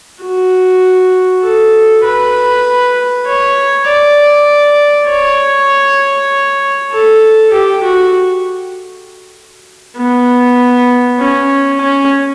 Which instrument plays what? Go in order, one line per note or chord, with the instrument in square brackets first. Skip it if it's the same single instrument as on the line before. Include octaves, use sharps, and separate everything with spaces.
[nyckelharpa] F#4
A4
B4
C#5
D5
C#5
A4
G4
F#4
B3
C#4
C#4